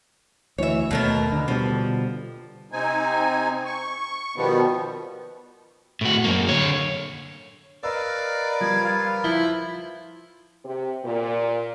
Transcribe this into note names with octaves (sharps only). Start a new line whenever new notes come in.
D2 E3 C#5 E5
D#2 B2 D#3 A3 A#4
D3
B2 D3 F3 G3
C3 C4 D#4 G#5
C#6
B2 D#3 F3 G3 B3
A2 F#4
F#2 A#3
D3 C#5
A#4 B4 D5 D#5 F5 E6
F3 G3 G#6
F4
F3 E4 C5 G7
C3
A#2